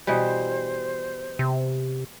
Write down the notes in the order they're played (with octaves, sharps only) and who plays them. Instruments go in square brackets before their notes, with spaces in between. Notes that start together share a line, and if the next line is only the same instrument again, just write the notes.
[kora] B2 E3 G3 [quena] C5
[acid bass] C3